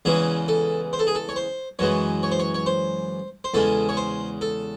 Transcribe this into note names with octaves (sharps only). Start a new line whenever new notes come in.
E2 C#3 E3 G#3 G#4
A4
C5
A4
G#4
A4
C#5
C5
F#2 E3 G#3 C#5
C#5
C5
C#5
C#5
C5
C5
E2 C#3 G#3 A4
C#5
C5
A4